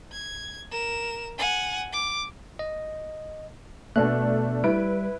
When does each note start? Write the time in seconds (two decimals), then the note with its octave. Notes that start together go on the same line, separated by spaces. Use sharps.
0.12 G#6
0.71 A#4 E7
1.38 F#5 G#5
1.93 D6
2.59 D#5
3.96 B2 A3 B3 D4 A4 F#6
4.64 G3 E4 B4 D7